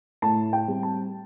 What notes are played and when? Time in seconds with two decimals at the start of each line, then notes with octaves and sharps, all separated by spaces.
0.22 A2 A5
0.53 G5
0.68 G3 C4
0.83 A5